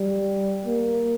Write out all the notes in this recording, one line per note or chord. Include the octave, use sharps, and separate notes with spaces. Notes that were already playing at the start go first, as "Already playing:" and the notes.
Already playing: G3
A#3